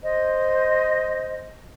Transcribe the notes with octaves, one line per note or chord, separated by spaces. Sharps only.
C5 D#5